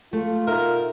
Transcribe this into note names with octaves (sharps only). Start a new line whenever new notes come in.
A3 F4
B2 D#4 A#4 E5